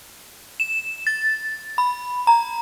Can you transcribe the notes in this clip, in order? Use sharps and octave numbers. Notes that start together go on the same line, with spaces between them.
E7
A6
B5
A#5